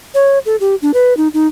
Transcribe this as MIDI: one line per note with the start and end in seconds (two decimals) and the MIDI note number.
0.14 0.39 73
0.46 0.56 69
0.60 0.75 67
0.82 0.91 62
0.94 1.16 71
1.17 1.28 63
1.34 1.47 63